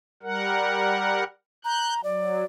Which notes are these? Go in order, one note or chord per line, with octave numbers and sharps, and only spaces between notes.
G3 A#4 F#5
A#5 F#6 G6
F#3 D5